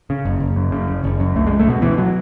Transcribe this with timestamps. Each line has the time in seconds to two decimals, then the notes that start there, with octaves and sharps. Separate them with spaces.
0.10 C#3
0.25 F#1
0.40 F#1
0.56 F#2
0.72 C#3
0.88 F#1
1.04 F#1
1.20 F#2
1.35 C#2 A3
1.47 G#3
1.50 C#2
1.59 A3
1.67 B2 B3
1.82 B2 E3
1.98 F#3